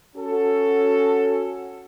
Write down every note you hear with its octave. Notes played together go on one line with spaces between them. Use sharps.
C#4 F#4 A4